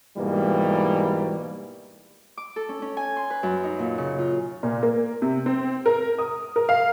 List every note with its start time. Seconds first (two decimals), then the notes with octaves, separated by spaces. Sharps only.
0.17 G#2 B2 E3 G3 A#3
2.37 D6
2.56 A4
2.69 C#4
2.82 C#4
2.97 G#5
3.16 C6
3.30 B4
3.43 F#2
3.64 D#4
3.79 A#2
3.98 C#3
4.18 F4
4.63 A#2
4.83 A#3
5.22 C3
5.46 C4
5.86 A#4
6.18 D#6
6.56 A#4
6.69 F5